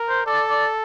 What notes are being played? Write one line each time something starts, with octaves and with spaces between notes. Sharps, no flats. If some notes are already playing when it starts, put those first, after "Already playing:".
Already playing: A#4
C5
A4 D5
D5